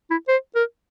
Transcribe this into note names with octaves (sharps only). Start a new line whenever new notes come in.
E4
C5
A#4